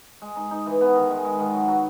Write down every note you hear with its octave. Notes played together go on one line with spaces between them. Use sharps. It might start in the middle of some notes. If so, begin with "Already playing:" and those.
G#3
D#4
D#4
E3
B3
D#3
G#3
G#3
D#3
F#3
F#3